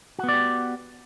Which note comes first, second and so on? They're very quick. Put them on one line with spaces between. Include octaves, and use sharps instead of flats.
F#4 B3 D5 G4